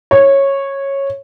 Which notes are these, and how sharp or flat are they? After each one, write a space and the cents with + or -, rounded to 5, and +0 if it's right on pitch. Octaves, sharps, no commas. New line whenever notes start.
C#5 -10